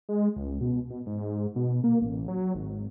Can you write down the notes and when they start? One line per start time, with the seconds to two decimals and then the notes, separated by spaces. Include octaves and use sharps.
0.09 G#3
0.36 C#2
0.61 B2
0.90 B2
1.06 G#2
1.56 B2
1.84 A#3
2.01 A1
2.28 F#3
2.55 G#1